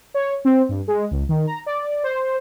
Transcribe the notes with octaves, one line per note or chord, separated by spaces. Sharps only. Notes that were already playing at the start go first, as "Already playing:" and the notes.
C#5
C4
G2
G#3
C#2
D#3
A#5
D5
C5